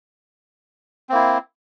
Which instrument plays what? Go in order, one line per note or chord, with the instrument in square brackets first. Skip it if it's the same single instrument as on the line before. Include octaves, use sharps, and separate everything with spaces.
[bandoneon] C4
A#3
E4